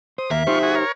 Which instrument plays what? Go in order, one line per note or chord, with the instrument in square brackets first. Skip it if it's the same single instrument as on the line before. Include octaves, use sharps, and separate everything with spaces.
[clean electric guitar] C5 [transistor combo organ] D#6
[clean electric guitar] D#2 [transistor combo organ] A#3 [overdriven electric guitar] E5
[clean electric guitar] D#4 G4 C5 [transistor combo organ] F4 C#6
[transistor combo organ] F#4 G#4
A#4 C#5